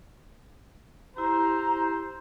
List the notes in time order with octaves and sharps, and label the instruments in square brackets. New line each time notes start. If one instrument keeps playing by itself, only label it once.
[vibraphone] E4 G4 [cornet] C5 [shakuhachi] A#5